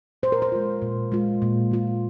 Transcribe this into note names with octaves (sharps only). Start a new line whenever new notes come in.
A#2 C5
A#4
C5
G#3 F4
A#2
G#3 F4
A#2
G#3 F4